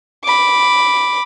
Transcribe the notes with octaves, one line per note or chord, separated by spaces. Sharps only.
B5 D6